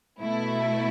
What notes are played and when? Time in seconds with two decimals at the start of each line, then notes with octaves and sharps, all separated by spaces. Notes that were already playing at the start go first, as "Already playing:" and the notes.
0.20 B2 A3 E4